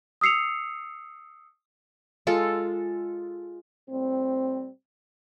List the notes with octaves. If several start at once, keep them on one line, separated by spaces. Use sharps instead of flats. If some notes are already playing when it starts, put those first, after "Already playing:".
D#6 E6 C7 C#7 F7
G#3 F4 A4
A2 G3 C4